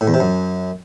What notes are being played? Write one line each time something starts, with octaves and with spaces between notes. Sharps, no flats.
A2
E2
C3
F#2